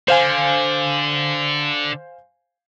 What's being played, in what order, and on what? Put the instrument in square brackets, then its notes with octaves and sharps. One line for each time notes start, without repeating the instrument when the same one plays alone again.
[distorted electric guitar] D3 [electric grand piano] C5 F5 G#5